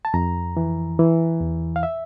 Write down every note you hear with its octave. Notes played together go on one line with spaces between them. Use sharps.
A5
F2 A#5
E3
E3
E2
F5
E5